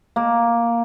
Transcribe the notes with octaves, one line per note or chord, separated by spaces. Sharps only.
A#3